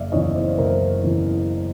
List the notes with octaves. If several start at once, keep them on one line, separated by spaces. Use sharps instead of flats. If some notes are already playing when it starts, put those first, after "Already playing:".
Already playing: F#1 D5 E5 F5
E2 C#3 E3 C#5 D#5
C5 D5
F#1 A#4 C5
E2 C#3 E3